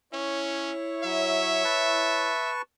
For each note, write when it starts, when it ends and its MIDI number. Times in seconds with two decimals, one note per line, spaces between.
0.13 0.72 61
0.13 2.33 64
0.13 2.33 73
1.04 1.63 54
1.04 2.51 76
1.64 2.62 71
1.64 2.62 81
1.64 2.62 85